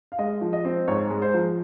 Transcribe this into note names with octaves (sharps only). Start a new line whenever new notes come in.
F5
G#3 D#5
F3
D#5
C4
G#2 C#5
G#3
C5
F3